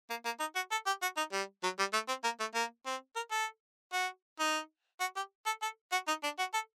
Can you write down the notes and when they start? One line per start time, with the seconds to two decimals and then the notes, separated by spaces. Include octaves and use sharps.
0.10 A#3
0.25 A#3
0.40 D#4
0.55 F#4
0.71 A4
0.86 G4
1.02 F#4
1.17 D#4
1.33 G3
1.63 F#3
1.79 G3
1.93 A3
2.08 C4
2.24 A#3
2.40 A3
2.54 A#3
2.86 C4
3.16 A#4
3.31 A4
3.93 F#4
4.40 D#4
5.00 F#4
5.16 G4
5.46 A4
5.62 A4
5.92 F#4
6.08 D#4
6.24 D4
6.39 F#4
6.54 A4